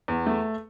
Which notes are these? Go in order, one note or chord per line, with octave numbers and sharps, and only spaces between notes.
E2
A3